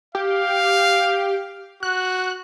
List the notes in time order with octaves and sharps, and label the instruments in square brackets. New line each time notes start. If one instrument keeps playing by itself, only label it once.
[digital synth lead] G4 [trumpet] F5
[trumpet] F#4 [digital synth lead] F#6